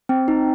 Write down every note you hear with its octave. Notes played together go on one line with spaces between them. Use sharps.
C4
D#4